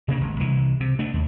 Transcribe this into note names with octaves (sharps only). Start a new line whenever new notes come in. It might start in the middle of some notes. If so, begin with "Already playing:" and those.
C3 A#3 D4
G#1
C2 E3
C3
A3 D4
D#2